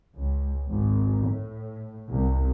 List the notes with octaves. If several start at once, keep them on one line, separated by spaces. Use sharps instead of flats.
C#2
G#1
A2
C2